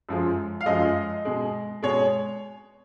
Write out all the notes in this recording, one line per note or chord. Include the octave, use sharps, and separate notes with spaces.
F#2 F3 G#3
F5
F#2 F3 G#3 D#5
B2 G#3
B2 G#3 C#5